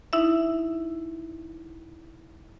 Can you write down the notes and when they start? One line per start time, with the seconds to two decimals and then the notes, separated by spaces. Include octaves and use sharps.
0.13 D#4 E4 E5